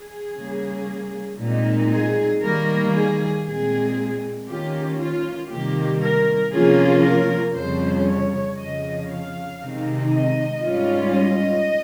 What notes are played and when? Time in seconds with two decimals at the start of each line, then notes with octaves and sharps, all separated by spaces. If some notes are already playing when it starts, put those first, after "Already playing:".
Already playing: G#4
0.36 C#3 G3 A#3
1.39 A#2 G#3 C4 D#4
1.91 G#4
2.42 D#3 G3 A#3 A#4
2.94 G#4
3.45 A#2 G#3 C4 G#4
4.47 D#3 A#3 C#4 F4 G4
4.99 F4
5.50 C3 D#3 G3 A#3 G4
6.02 A#4
6.53 C3 F3 A#3 C#4 F4 G#4
7.04 A#4
7.55 F2 C#3 G3 C5
8.07 C#5
8.58 F2 C#3 F3 D#5
9.09 F5
9.61 C3 D#3 G#3 C4 D#4
10.12 D#5
10.64 G#2 G3 C#4 F4
11.15 D#5